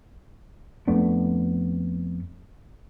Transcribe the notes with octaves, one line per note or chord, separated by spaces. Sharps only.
F2 A3 B3 D4